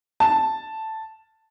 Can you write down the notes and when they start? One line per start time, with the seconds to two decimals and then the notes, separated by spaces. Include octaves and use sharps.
0.20 A5